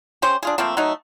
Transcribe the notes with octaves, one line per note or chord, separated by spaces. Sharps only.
C#4 G4 C5
D4 F4 G#4
F3 A3 A#3 C4
F#3 A3 D#4